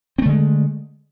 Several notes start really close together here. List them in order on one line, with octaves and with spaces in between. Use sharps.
C4 A3 D3 G#3